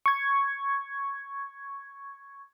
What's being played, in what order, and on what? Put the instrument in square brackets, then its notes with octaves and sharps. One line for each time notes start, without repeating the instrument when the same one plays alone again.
[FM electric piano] C#6 G#6